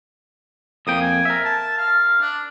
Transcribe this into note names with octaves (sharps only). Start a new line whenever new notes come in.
F2 A#3 G5 D#6
G#5
A#4 E5
A5
F5
D4